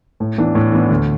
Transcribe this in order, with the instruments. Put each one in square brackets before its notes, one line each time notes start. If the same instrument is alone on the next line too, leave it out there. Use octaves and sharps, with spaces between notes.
[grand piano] A2
E3 B3 D4
A2
E3 B3 D4
D2